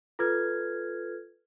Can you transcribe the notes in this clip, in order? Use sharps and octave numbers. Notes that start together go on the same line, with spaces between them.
F4 A4 B4 F6 G#6